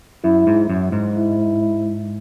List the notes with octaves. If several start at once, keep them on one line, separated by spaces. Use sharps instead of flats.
F#2 E4
G#2
F#2
G#2
E4